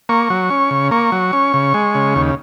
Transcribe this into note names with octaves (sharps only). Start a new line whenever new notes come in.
A#3 C#6
F#3
C#4
C#3
A#3 C#6
F#3
C#4
C#3
G#3
C#3
D#2